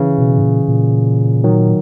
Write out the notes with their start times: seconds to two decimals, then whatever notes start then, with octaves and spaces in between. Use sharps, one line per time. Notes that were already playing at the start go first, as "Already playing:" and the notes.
Already playing: C#3 E3
0.18 B2
0.38 G#2
0.43 A#2
0.68 A#2
1.44 D#3 F#3